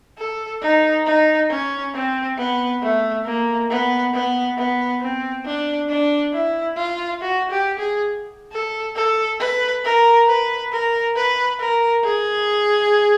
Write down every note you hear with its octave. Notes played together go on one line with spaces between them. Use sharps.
A4
D#4
D#4
C#4
C4
B3
A3
A#3
B3
B3
B3
C4
D4
D4
E4
F4
F#4
G4
G#4
A4
A4
B4
A#4
B4
A#4
B4
A#4
G#4